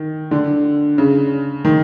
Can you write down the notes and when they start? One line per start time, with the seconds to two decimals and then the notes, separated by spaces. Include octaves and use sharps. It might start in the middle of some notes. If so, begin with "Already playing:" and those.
Already playing: D#3
0.31 D3
0.98 C#3
1.65 D#3